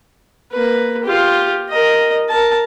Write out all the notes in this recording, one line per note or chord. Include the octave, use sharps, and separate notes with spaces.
A#3 B4
F4 G4
A#4 D#5
A#4 A5